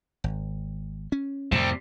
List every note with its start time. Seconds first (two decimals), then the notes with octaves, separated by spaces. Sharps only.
0.24 G#1
1.12 C#4
1.52 F2 A2 C3 G3